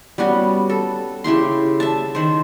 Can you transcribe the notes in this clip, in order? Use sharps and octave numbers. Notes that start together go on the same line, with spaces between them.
G3 B3 C#4 F#4
A4
C#3 E4 G4 C6
E5 A5
D#3 C5